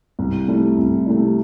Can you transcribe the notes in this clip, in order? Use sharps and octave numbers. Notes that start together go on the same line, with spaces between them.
C2
C3 A3 E4
C2
C3 A3 E4